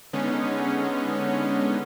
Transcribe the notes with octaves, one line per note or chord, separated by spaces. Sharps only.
D3 G#3 B3 C#4 D#4